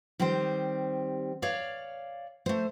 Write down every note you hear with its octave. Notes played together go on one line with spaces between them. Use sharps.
D#3 G3 C4 G4 C5
C#5 D5 F5
A3 C5